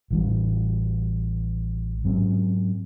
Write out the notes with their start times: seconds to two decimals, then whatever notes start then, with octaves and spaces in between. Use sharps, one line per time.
0.10 A1 E3 G3
2.04 G#2 F#3 C4 C#4